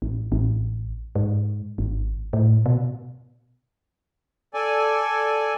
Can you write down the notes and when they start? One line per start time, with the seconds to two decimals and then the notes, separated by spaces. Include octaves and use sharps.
0.02 A1
0.32 A1
1.15 G#2
1.78 G#1
2.33 A2
2.66 B2
4.54 A4 D5 G#5